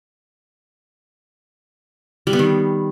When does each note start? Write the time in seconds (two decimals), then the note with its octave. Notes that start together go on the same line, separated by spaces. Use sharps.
2.27 G3
2.33 B3
2.39 D#3